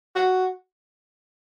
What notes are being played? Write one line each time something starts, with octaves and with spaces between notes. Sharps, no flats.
F#4